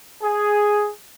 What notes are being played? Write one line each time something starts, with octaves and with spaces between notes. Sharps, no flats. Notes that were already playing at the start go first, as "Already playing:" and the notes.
G#4